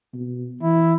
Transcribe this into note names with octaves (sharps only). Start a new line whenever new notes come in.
B2
E3 E4